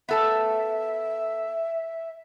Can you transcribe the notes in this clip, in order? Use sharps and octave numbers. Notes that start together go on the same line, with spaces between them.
B3 A4 E5 A5